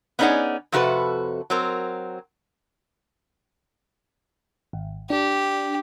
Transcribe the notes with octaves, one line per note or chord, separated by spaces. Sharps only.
B3 C#4 D#4 G#4 D5 F#5
F2 C3 F#4 A4 B4
F#3 C4 A#4
G#1
D4 G4